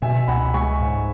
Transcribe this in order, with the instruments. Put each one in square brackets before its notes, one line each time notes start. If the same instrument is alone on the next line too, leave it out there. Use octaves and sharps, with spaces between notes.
[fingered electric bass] B2 [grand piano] E5 G#5
[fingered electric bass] C#2 [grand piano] F#5 B5
[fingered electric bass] G#3 [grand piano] G#5 C#6
[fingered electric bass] G#2